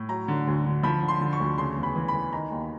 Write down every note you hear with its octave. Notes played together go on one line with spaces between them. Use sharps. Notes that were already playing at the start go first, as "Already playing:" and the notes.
Already playing: A2
F#3 A#5
D3
D2
D3
F3 B5
D3
C6
D3
C#6
D2
C#3 C6
E2
B5
E3
B5
E3
D#3 A#5
D#2